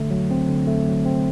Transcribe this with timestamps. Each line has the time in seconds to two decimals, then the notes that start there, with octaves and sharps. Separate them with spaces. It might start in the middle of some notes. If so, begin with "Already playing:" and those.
Already playing: D3 A3
0.11 F#3
0.31 C4
0.49 D3
0.67 A3
0.87 F#3
1.06 C4